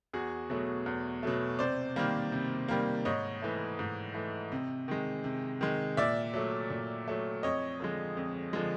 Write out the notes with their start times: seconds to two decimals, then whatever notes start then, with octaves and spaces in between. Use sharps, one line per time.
0.13 E2 F#4 G#4
0.50 B2 F#3 A3
0.86 E2
1.23 B2 F#3 A3
1.59 C3 C5 D5
1.96 D#3 G3 A#3
2.32 C3
2.68 D#3 G3 A#3
3.05 G#2 C#5 D#5
3.42 E3 A3
3.79 G#2
4.14 E3 A3
4.52 C3
4.88 D#3 G#3
5.24 C3
5.61 D#3 G#3
5.97 A#2 D5 E5
6.34 F#3 A3
6.70 A#2
7.08 F#3 A3
7.43 F2 C#5 D#5
7.80 D3 F3 G#3
8.17 F2
8.53 D3 F3 G#3